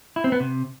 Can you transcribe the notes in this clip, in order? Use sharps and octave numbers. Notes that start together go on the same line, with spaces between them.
E4
C4
B3
C3